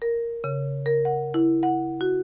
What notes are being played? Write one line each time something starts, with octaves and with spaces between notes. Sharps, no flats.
A#4
C#3
A#4
F#5
E4
F#5
F#4